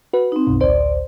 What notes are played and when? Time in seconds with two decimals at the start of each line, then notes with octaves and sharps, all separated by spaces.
0.13 F#4 B4
0.32 C4 D#4
0.47 B1 F#2 B2
0.61 A1 D2 C5 D5